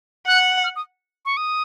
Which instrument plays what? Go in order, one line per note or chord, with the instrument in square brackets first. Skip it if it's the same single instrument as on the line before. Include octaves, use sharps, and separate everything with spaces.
[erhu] F#5 [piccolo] F#6
[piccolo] F6
D#6
C#6
D#6